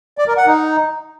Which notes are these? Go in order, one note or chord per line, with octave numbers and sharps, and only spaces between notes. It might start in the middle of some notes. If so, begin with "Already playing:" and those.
D5
A#4
F#5
D#4